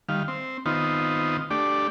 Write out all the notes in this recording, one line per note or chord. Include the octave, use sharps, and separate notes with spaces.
D#3 G3 F5
C4
D#3 B3 C4 D#4 F4
A3 D4 G4 D5